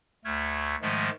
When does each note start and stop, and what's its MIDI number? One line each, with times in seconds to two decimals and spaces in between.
0.24 0.75 38
0.24 0.75 57
0.24 0.75 89
0.24 0.75 92
0.82 1.10 44
0.82 1.10 51
0.82 1.10 53
0.82 1.10 56
0.82 1.10 57